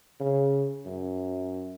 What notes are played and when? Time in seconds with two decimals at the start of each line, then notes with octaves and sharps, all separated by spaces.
0.20 C#3
0.86 F#2